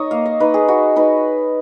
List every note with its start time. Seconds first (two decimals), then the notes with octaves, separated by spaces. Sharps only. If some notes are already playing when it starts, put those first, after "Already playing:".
Already playing: D#4 C#5 D#5
0.11 A#3 F5
0.26 D#5
0.40 D#4 B4
0.54 G#4
0.68 D#4 F#4
0.96 D#4 B4